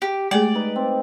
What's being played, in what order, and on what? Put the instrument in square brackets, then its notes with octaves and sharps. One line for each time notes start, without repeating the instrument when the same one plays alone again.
[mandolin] G4
[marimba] G#3 A3 G#4 [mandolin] D5
[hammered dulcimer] D#4 B4
C4